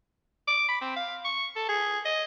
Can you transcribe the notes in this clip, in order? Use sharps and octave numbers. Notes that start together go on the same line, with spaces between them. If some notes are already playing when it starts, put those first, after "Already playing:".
D6
B5
C4
F5
C#6
A4
G#4
D#5